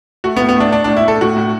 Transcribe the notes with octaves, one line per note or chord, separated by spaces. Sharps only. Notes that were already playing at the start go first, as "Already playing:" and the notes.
A3 F#4
B3
A2
B3
A3 D4
A3 D4
D4
A2
E4
A3 A4
A2 F#4
A2